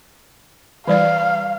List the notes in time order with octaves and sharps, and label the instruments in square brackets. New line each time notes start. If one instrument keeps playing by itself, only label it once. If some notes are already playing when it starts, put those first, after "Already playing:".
[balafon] E3 G3 D5 [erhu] F5